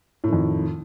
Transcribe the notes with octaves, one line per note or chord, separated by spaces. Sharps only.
F2 A2 D#3